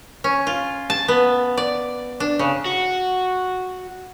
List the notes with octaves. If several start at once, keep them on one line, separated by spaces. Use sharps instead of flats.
C#4
F4
A5
B3
D5
D4
C#3
F#4